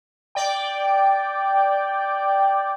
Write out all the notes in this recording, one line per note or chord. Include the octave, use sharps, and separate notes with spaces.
D5 G5